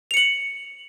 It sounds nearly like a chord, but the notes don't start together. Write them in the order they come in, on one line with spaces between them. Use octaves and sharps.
F7 C#7 F#7